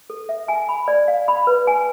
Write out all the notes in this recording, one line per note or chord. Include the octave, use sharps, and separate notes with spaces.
A4
E5
G#5
B5
D5
F5
B5
B4
G#5